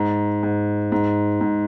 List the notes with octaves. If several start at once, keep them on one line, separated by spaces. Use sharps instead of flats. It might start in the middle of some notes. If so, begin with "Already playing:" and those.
Already playing: G#2
G#2
G#2
G#2